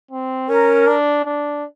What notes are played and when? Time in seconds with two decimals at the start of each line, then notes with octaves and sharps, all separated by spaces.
0.11 C4
0.49 C#4 A#4
0.87 D4
1.25 D4